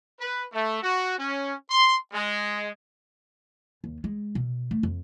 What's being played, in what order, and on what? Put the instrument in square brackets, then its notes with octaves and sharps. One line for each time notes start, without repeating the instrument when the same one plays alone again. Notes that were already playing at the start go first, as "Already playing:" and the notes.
[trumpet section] B4
A3
F#4
C#4
C6
G#3
[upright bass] D#2
G#3
B2
A3
F2